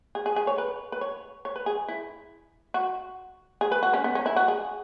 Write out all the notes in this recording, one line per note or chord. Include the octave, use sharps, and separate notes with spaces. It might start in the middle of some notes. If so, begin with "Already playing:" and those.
G#4
G#4
G#4
C#5
B4
B4
C#5
C#5
B4
G#4
E4
F#4
G#4
B4
F#4
C#4
B3
C#4
E4
F#4
G#4